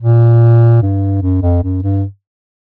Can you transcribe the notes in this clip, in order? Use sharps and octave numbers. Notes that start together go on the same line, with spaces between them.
A#2
G2
F#2
F2
F#2
G2